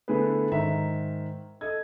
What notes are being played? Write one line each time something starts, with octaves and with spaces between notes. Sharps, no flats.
D3 A3 B3 E4 G#4 B4
G#2 D#3 E5 A#5
A4 D#5 G#6